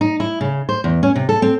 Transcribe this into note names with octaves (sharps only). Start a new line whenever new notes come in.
D#4
E4
C#3
C5
E2
C#4
C3
A4
C4